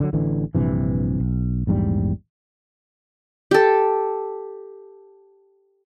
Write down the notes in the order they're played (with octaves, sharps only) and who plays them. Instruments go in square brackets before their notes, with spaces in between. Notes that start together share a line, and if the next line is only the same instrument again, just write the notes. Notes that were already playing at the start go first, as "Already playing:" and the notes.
[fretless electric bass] D3 F#3
A1 D3 E3
A#1 G2 C3 E3
B1
A#1 E2 G#2 G3
[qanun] G4 A4